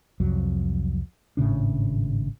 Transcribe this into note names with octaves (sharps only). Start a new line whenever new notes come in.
C2 F2 F#3
G#1 A2 C#3 D4